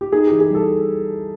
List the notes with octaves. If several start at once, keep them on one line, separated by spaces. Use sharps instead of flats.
G4
D#4 G#4
E3 G4
G#4
G3 A4